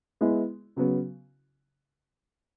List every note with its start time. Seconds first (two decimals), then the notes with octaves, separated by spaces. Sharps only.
0.21 G#3 B3 E4
0.76 C#3 F#3 B3